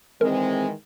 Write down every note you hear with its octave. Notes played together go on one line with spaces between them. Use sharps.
D#3 E3 G#3 C4 A#4